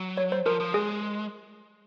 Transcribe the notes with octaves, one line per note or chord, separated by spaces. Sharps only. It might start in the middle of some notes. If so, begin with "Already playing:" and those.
Already playing: F#3
C#5
C5
F3 A#4
F3
G#3 G#4